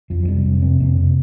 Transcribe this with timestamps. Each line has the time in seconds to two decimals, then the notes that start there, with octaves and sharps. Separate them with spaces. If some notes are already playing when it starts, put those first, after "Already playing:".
0.10 F2 F3
0.23 F3
0.28 C3 G3
0.45 F2
0.62 C3 C4
0.80 F2 A#3
0.97 C3